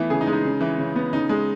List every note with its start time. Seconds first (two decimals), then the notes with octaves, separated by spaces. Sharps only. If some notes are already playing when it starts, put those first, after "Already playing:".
Already playing: E3 A3 B3
0.10 C#3 G#4
0.21 D#4
0.27 G#3
0.33 D#4
0.45 C#3
0.61 E3
0.78 C#3
0.96 B3
1.13 C#3 D#4
1.29 G#3